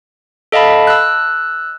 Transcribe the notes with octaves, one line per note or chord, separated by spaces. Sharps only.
A4 D#5 F5 A5 B5
E6 F#6